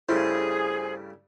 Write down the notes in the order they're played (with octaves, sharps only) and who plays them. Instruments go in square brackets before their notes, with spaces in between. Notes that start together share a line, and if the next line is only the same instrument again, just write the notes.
[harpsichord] G2 C#3 A3 [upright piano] E4 [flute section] G#4 [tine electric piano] C5